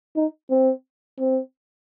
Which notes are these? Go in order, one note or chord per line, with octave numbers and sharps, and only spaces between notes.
D#4
C4
C4